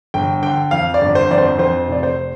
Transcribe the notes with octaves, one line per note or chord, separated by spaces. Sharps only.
G1 G5
D3 G5
F2 F5
D5
G1
C5
F2 D5
C5
F2 C5
F1 D5
C5